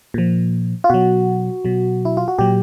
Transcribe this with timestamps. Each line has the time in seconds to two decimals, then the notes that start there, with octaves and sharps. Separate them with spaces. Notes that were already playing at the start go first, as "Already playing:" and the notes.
0.14 A#2 F3
0.84 F4
0.90 B2 F#3 F#4
1.65 B2 F#3
2.05 E4
2.17 F4
2.28 F#4
2.38 A#2 F#3 G4